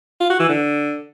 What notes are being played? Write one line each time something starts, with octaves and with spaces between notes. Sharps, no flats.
F4
F#4
E3
D3